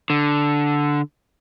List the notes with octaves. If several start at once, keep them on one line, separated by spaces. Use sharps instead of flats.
D3